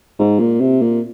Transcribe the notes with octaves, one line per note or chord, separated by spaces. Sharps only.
G#2
A#2
C3
A#2